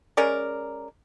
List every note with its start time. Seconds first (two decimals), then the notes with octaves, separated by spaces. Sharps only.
0.17 G#3 C#4 A#4 D5